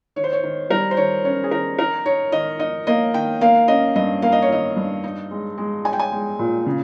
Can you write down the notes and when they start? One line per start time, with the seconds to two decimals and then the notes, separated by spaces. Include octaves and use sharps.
0.16 D#3 C#5
0.24 C5
0.33 C#5
0.43 D#3
0.70 G3 A#4
0.91 C5
0.97 D#3 C#5
1.24 C#4 C#5
1.44 G#4
1.51 D#3 A#4
1.79 D#4 A#4
2.06 D#4 C#5
2.32 D#3 D#5
2.59 D#4 D#5
2.87 A#3 D#5
3.14 D#3 G5
3.41 A#3 F5
3.68 C#4 D#5
3.95 G2 D#5
4.22 A#3 F5
4.32 D#5
4.42 C#5
4.50 D#3 D#5
4.76 G2
5.04 D#4
5.31 G#3
5.58 G#3
5.85 D#4 G#5
5.93 G5
5.99 G#5
6.12 G#3
6.39 A#2
6.66 C#3